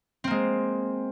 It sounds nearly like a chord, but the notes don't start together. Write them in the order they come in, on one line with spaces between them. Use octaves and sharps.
C4 A#3 G#3